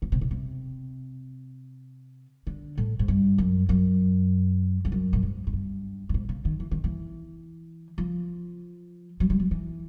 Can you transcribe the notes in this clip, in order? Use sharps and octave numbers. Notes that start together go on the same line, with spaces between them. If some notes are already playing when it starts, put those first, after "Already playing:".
C#3
C3
B2
C3
D3
A2
G#2
G2
F#2
F#2
F2
F#2
A2
G#2
G#2
G2
G2
G#2
C#3
D#3
E3
D#3
E3
F3
F#3
G3
F#3
E3